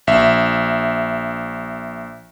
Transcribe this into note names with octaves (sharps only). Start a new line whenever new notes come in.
A#1 E5